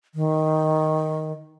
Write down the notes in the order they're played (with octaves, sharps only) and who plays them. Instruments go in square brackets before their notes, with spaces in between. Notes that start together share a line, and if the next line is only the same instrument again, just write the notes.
[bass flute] D#3